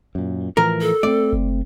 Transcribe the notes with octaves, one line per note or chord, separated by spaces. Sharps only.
F#2 A#2
A2 E3 F3 A#4
A4
A3 B3 C4 D5
F#1